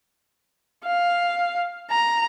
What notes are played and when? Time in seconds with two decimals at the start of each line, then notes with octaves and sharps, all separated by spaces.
0.86 F5
1.91 A#5